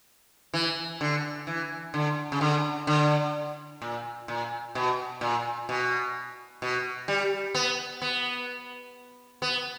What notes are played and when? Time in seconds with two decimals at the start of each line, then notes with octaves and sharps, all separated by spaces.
0.54 E3
1.01 D3
1.47 E3
1.94 D3
2.32 C#3
2.41 D3
2.87 D3
3.82 A#2
4.28 A#2
4.75 B2
5.21 A#2
5.69 B2
6.62 B2
7.08 G3
7.55 B3
8.02 B3
9.42 B3